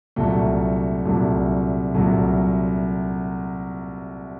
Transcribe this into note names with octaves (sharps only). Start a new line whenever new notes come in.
C2 A#2 F#3 A3
C2 A#2 F#3 A3
C2 A#2 F#3 A3